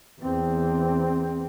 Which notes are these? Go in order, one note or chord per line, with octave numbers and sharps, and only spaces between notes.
E2 C4